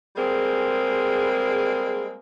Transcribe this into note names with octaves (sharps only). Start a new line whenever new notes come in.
G3 G#3 A#3 C4 G#4